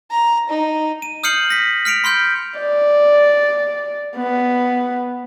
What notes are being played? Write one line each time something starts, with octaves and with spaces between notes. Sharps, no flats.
A#5
D#4
D#7
D#6 F6 G6 C7 C#7 F#7
A#6 B6
F6 B6 C#7 D7 F7
B5 C6 F6 G6
D5
B3